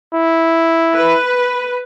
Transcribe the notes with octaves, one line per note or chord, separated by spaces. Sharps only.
E4
B4